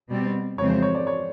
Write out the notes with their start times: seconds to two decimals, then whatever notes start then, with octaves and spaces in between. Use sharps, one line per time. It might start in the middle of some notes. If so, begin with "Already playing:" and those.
0.09 B2 G3 C4
0.58 F2 C#3 E3 G#3 C4 C#5
0.70 C5
0.82 C#5
0.95 D5
1.07 C#5